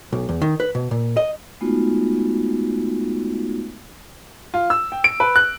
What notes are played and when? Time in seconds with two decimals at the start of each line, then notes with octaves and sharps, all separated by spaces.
0.13 B1
0.29 E2
0.42 D#3
0.60 B4
0.75 B2
0.91 A#2
1.17 D#5
1.61 G#3 A3 B3 D#4 F4 F#4
4.54 F4
4.70 E6
4.92 G5
5.04 D7
5.20 B4
5.36 F#6